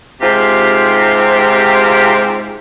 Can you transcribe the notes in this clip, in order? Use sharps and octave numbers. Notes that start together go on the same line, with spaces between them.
G#2 C3 C4 F4 G4